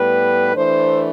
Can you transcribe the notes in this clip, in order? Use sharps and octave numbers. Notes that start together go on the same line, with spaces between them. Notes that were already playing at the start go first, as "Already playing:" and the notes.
Already playing: A2 G3 B3 B4
E3 A3 D4 C5